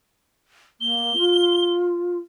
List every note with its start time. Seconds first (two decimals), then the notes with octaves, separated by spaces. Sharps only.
0.81 A#3 G7
1.17 F4